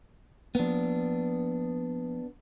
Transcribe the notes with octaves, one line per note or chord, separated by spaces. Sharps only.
F3 A#3 B3 D4